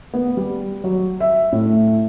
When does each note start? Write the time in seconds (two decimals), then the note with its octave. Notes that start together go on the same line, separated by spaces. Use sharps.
0.14 B3
0.37 G3
0.84 F#3
1.20 E5
1.52 A2